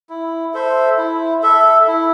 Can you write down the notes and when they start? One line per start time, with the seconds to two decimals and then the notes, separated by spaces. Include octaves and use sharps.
0.09 E4
0.54 A4 C5 E5
0.98 E4
1.43 A4 E5
1.87 E4